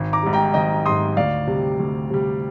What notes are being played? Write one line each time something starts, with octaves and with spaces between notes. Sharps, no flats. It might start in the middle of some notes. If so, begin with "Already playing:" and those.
Already playing: G#1
A#5 D6
G#2 G3
G5 A#5
G#1 D#5 G5
G#2 G3 C6 D#6
D2 D5 F5
C3 G3
D2
C3 G3